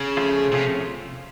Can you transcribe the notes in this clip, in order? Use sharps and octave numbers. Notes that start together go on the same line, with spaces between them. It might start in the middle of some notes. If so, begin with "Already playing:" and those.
Already playing: C#3
F3 A3 C#4 F4
C3 F3 A3 C#4 F4